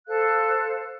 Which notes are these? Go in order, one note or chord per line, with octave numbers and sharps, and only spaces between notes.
A4 C5 F5 F#6